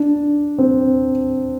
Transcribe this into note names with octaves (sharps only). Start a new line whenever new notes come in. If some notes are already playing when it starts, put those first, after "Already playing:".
Already playing: D4
C4